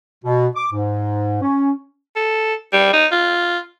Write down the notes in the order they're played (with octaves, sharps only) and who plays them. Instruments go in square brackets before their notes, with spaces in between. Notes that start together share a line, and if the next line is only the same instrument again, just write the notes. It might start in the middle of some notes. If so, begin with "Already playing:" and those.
[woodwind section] B2
D6
G#2
C#4
[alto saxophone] A4
G3
D#4
F4